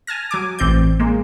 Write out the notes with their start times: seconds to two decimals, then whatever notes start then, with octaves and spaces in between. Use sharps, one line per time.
0.07 G#5 A5 F6 A#6
0.31 F#3 G#5 D6
0.59 A1 C4 D5 G6
1.00 G#3 A#3